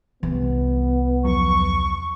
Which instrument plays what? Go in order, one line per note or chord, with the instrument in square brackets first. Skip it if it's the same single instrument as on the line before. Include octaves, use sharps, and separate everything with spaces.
[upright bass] C2 [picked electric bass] E3 [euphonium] B3
[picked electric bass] E2 F3 F#3 [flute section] C#6